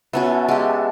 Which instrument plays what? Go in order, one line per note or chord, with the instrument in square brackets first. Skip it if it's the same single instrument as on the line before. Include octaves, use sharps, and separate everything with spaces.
[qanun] B3 C#4 F#4 [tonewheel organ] E5 F#5 A5
[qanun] G#3 G4